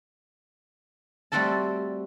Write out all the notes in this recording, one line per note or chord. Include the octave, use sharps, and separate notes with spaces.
G3 A3 C4 F#4 A4 A5